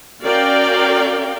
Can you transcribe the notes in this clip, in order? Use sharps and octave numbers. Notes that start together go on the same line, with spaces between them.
C#4 F#4 A#4 D5 F5 G5